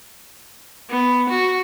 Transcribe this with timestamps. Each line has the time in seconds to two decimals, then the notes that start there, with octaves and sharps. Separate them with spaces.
0.90 B3
1.30 F#4